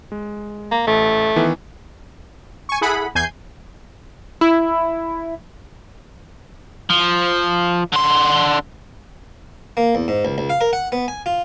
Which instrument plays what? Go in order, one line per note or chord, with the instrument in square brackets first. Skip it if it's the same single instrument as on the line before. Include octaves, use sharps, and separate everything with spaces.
[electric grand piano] G#3
[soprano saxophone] A#3
[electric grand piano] A1 [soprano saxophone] A3
[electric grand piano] D#3 E3 B3
[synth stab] G#5 C#6
E4 G#4 A4 F#5 B5
E2 G#5 G6 G#6 C7
[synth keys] E4
[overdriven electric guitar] F3
D3 C6
[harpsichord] A#3
E2
G#2
C#2
C#2
F5
A#4
F#5
B3
G#5
F4